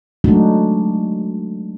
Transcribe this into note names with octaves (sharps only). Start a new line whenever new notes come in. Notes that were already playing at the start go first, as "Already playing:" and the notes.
F#3 G#3 A3 D4 D#4 F#4